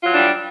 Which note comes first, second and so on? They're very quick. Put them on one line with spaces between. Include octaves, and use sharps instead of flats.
F4 F#3 E3 D4 G3